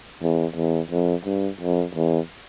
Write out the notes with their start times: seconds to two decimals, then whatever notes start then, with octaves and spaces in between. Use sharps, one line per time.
0.22 E2
0.56 E2
0.90 F2
1.25 G2
1.60 F2
1.95 E2